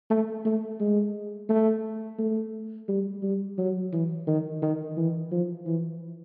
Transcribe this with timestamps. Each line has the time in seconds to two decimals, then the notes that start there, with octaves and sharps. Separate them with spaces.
0.11 A3
0.45 A3
0.80 G#3
1.49 A3
2.19 A3
2.89 G3
3.23 G3
3.58 F#3
3.92 E3
4.27 D#3
4.62 D#3
4.97 E3
5.31 F3
5.67 E3